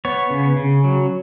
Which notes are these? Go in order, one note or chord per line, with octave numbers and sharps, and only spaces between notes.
B3 C#5
C#3
C#3
F#3